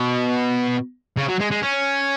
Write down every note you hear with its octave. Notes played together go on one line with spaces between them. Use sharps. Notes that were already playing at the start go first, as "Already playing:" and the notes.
Already playing: B2
C#3
F#3
G#3
G#3
C#4